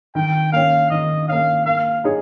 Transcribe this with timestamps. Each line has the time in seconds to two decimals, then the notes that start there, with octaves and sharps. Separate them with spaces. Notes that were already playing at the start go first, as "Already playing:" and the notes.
0.15 D#3 G5
0.53 A#3 C#4 F5
0.90 D#3 D#5
1.29 A#3 C#4 F5
1.66 A#3 F5
2.04 D#4 G#4 C#5